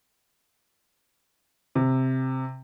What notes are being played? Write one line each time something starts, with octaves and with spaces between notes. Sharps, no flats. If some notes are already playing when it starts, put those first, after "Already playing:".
C3